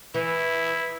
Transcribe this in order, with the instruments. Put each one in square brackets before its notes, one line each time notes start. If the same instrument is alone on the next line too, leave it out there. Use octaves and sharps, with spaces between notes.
[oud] E3 [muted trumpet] E4